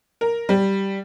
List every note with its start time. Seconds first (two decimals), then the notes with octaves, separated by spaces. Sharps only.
0.21 A#4
0.49 G3